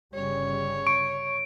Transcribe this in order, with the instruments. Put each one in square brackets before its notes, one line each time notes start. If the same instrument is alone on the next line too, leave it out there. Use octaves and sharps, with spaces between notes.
[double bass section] G1 C#3 G3 [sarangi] C#5
[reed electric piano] C#6 [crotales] D7